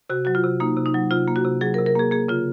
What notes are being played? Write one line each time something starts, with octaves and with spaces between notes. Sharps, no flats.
C3 F#4
F#3 F#4
F4
C3
A#3 D#4
C3
D#4
F#3
C3 F4
A#3
F#4
C3
F#3 G#4
A#4
C3
A#4
A#3 G#4
A#3 G#4
C#3 F4